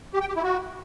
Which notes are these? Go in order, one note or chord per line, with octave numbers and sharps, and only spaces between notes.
G4
G5
G4
E4
F#4